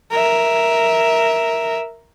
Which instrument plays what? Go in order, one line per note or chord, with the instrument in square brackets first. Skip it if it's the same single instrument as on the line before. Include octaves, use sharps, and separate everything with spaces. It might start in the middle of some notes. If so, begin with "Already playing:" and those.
[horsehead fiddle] A#4 E5